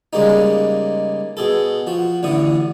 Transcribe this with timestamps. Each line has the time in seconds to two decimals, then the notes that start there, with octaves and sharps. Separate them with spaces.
0.13 C#3 G3 G#3 A#3 D#4
1.37 B2 G#4 A4
1.87 F3 F#4
2.23 A1 A2 D3 C#6 D#6